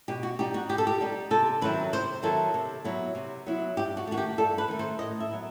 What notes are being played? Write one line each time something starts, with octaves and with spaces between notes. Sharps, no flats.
B2 G4
F#4
G3 D#4 G4
F#4
B2 G4
A4
G4
G3 D#4
C3 A4
D#3 F#3 C4 E4 B4
C3 C5
D#3 F#3 C4 E4 A4
C3
F#3 B3 E4
C3
F#3 B3 E4
G2 G4
F#4
D#3 A3 F#4
G4
G2 A4
B4
D#3 A3
C5
A2 D#5
E5
F#3 B3 E4